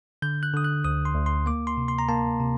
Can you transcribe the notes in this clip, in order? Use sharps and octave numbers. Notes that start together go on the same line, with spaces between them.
D3 G6
F#6
D3 D#6
F#6
D2 D#6
C6
D2
C6
A#3 D6
C6
C3
C6
A#5
A#3 A5
C3